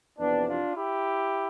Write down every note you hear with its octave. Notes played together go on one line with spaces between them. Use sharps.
F2 C3 E3 B3 D4
D4 F4
E4 G4